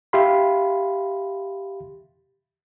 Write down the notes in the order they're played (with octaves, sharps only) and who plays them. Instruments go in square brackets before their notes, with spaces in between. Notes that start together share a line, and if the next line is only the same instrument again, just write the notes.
[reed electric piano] G4 E5 F5 B5 C6